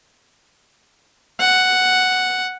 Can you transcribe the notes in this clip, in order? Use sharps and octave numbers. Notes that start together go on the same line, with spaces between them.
F#5